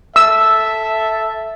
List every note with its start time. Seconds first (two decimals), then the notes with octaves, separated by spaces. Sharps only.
0.16 A4 E5 E6